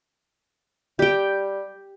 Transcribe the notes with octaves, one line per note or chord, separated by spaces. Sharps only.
G3 G4 G5